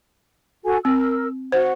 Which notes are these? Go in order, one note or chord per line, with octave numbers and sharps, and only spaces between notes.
F#4 A4 G#5
C4 A#4 E6
F#4 C5 F#5